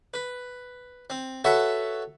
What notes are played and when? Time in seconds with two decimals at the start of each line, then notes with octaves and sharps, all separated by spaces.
0.14 B4
1.10 C4
1.44 F#4 A4 B4 C#5 E5 A5